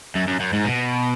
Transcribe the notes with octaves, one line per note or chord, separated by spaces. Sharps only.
F#2
F#2
F#2
G#2
B2